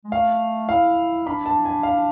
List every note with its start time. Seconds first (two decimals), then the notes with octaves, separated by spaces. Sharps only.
0.04 G#3
0.11 A3 F5
0.69 E4 F5
1.27 D4 B5
1.46 A5
1.65 G#5
1.83 F5